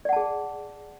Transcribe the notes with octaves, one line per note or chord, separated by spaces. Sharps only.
G#4 D5 F#5 A5